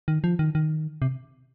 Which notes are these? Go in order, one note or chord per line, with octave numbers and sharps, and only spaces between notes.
D#3
F3
D#3
D#3
C3